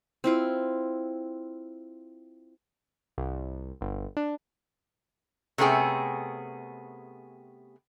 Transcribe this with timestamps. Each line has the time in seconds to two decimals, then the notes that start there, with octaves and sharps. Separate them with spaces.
0.24 C4 E4 F4
3.18 C2
3.81 G1
4.17 D4
5.58 C3 A3 B3 C#4 G#4 G5